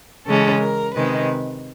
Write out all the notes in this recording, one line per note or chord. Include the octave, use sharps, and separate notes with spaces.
C#3 E3 G#3 C#4 A4
A#4
C3 D#3 G#3 B4